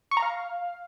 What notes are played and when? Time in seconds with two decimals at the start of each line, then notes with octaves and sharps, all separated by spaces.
0.11 C#6
0.17 A#5
0.22 F5